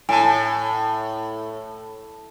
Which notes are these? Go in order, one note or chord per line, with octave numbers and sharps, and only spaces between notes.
A2 G#5 A5